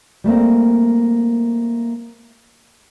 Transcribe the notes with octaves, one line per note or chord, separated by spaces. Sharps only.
G3 A3 A#3 C4